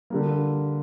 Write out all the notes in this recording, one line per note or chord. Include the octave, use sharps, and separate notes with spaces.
D3 G3 A#3